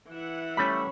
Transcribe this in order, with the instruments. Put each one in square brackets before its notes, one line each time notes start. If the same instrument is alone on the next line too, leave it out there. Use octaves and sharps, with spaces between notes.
[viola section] E3 E5 F#5
[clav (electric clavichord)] G3 A3 [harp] C#4 B5